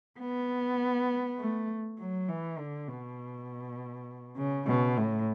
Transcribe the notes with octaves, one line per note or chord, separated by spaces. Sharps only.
B3
A3
F#3
E3
D3
B2
C#3
B2
A2